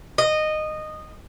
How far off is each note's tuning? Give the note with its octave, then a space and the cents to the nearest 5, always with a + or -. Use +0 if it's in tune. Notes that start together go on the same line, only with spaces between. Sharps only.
D#5 -15